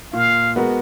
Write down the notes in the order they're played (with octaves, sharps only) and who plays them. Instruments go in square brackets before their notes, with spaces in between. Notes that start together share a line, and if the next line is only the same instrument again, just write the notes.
[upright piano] A#2 [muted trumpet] F5
[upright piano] G#3 B3 F#4 A#4